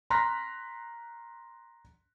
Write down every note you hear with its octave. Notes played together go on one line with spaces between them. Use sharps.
A#5 C6 F6 F#6 A#6 B6